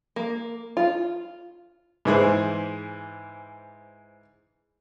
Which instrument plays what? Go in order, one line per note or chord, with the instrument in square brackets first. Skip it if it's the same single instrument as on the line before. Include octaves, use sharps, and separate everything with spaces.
[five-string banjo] A#3
F4
[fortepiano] G#2 E3 G#4 C5